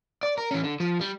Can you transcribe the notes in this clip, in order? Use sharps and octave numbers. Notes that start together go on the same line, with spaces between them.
D5
A#4
E3 C#4
D3
F3
G3